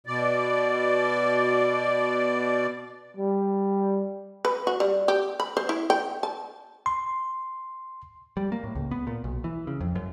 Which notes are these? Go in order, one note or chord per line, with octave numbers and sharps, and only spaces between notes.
B2 D5
G3
B4
F#4
G3
G4
B5
C5
E4
G5
A5
C6
G3
A#3
A2
C#2
B3
A#2
B1
E3
C#3
F2
F#2